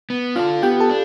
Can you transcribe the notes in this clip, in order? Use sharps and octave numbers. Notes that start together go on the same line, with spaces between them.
B3
D4 F4 A4 F5
B3 G4 G5
A4 A5
D4